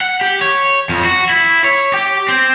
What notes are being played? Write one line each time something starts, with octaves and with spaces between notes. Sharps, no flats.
F#5
G4
C#5
F2
F#4
E4
C#5
G4
C4